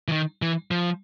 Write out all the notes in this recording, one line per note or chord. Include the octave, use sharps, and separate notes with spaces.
E3
D#3
E3
F3